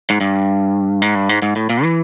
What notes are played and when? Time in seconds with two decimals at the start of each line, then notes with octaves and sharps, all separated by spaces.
0.10 G#2
0.21 G2
1.02 G#2
1.15 G2
1.29 G#2
1.42 G#2
1.56 A2
1.70 A#2
1.83 E3